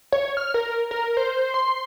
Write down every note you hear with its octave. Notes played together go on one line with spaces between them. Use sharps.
C#5
F6
A#4
A#4
C5
C6